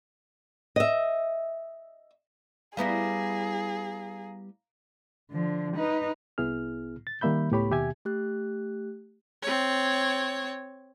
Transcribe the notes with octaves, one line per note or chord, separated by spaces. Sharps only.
D#5 E5
G3 B3 E4 G#4 F5 A#5 A#6
D3 F3
D#4 B4
C2 B3 E4 G#4 F6
A6
D#3 G3 A#3 E5 B5 G6
C#2 A2 B3 G4 C#5 B5
D#2 B2 G4 E5 G#5 G#6
A3 G4 F#6
C4 C#5